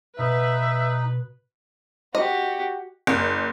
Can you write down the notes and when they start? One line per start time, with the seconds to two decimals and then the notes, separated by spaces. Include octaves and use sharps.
0.18 B2 D#4 B4 E5
2.15 F#4 G4 D#5
3.07 F#1